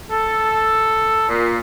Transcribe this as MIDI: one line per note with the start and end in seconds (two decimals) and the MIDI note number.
0.10 1.26 69
1.29 1.60 46